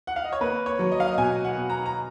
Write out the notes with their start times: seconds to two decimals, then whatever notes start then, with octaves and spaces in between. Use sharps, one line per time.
0.07 F#5
0.16 F5
0.24 D#5
0.33 C#5
0.41 A#3 B4
0.66 C#5
0.79 F#3
0.92 D#5
1.00 F5
1.07 D#5
1.18 B2 G#5
1.44 F#5
1.57 B2
1.70 A#5
1.86 A#5